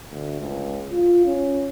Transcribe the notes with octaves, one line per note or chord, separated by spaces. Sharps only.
D2
C#2
F4
C#4